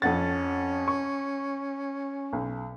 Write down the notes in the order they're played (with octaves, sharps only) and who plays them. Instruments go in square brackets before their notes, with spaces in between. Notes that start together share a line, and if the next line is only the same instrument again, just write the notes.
[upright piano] F2 F#5 A6 [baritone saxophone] C#4
[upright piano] C#6
B1